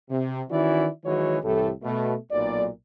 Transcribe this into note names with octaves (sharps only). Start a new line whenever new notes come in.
C3
D#3 E3 C#4 E4 F#4 D5
D#3 E3 F#3 G#3 F#4 C#5
C2 A2 E3 A3 G4 A4
B2 A3
B1 A#2 D5